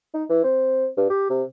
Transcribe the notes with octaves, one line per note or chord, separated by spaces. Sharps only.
D#4
E3
C4
G2
G4
C3